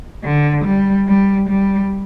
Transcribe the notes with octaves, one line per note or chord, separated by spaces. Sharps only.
D3
G3
G3
G3